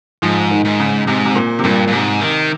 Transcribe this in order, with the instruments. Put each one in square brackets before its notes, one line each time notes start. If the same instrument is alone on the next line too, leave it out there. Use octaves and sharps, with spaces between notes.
[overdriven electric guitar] G#2 [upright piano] F3
[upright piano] D#3
[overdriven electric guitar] G#2
[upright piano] C#3
[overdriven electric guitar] G#2 [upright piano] C3
[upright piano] C3
A#2
C3
[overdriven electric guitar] G2 [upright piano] A#2
[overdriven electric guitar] G2
[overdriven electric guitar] G#2 [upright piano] C3
[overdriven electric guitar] D#3